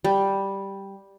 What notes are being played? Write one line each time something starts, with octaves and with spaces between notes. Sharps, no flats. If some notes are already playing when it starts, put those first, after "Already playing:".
G3